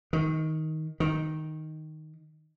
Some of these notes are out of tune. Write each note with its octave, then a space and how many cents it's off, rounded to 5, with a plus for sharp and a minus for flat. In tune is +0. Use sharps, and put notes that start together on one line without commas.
D#3 +15
D#3 +0